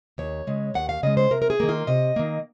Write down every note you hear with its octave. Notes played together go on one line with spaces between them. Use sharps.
D#2 C#5
C#3 G#3
D#2 F#5
F5
C#3 G#3 D#5
C5
C3 A#4
A#4
G#4
D#3 A#3
F4
C3 D#5
D#3 A#3